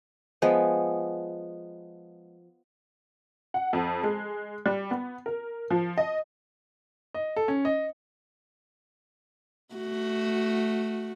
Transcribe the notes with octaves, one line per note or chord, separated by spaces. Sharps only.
F3 G#3 B3
F#5
F2
G#3
G3
B3
A#4
F3
D#5
D#5
A4
C#4
D#5
A3 F#4